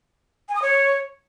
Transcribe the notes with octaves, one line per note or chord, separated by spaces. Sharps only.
G#5
D#6
C#5